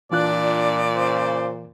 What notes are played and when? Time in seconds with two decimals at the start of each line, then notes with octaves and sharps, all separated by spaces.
0.12 A#2 E3 D4 F4 D5 F#6
0.94 C#3 C5